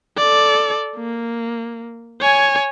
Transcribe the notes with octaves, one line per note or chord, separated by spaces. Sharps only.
A4 D5
A#3
C#5 G#5